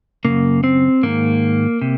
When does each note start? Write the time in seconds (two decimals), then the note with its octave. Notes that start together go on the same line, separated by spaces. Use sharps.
0.25 F#2 C#3 A#3
0.64 C4
1.03 G#2 D#3 A#3
1.82 C3